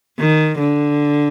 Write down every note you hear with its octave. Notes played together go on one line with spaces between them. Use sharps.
D#3
D3